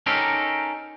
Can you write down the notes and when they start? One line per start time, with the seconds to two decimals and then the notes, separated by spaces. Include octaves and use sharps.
0.06 C#4 D#4 G4 A4 A#4 C5